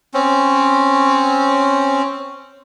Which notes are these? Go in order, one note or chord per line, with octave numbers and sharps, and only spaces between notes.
C4 C#4